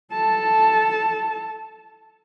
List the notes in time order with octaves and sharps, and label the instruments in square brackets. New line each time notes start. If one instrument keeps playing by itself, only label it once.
[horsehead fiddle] A4 A5